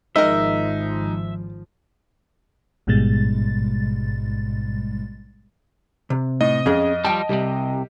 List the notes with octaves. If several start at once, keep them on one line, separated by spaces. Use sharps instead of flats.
G#1 F3 G#3 D#4 A#4 D#5 E5
A1 G#2 B2 G3 G#3 A6
C3
A2 D#5
F2 C#4 G#4
F3 G3 G5 A5
C2 C3 G3